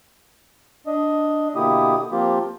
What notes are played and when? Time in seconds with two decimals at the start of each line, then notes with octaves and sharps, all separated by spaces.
0.87 D4 D#5
1.56 B2 D3 A#3 E4 G4 D#6
2.12 F3 A#3 C4 F4 G4